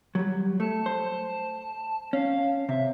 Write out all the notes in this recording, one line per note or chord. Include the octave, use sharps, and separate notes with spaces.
F#3 G3
A3 A5
C5
C#4 F5
C3 E5